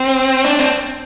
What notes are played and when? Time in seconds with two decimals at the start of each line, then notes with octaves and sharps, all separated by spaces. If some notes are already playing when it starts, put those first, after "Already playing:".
Already playing: C4
0.45 D4
0.59 C4